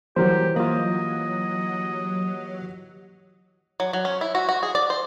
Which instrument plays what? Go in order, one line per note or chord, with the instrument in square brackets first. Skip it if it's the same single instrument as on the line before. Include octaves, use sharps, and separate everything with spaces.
[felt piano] E3 G3 [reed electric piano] F#3 A#4 C5 [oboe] G4
[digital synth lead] F#3 [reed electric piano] A#3 F4 [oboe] D#5
[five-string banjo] F#3
F#3
C#4
E4
F#4
F#4
G#4
D5
C5